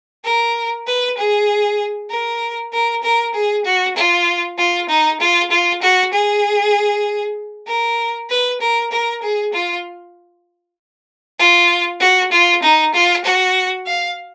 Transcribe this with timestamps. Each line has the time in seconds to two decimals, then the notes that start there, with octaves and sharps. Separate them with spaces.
0.24 A#4
0.87 B4
1.18 G#4
2.10 A#4
2.73 A#4
3.03 A#4
3.34 G#4
3.65 F#4
3.96 F4
4.58 F4
4.89 D#4
5.20 F4
5.50 F4
5.82 F#4
6.13 G#4
7.67 A#4
8.29 B4
8.60 A#4
8.91 A#4
9.22 G#4
9.53 F4
11.39 F4
12.00 F#4
12.32 F4
12.62 D#4
12.94 F4
13.24 F#4
13.86 F5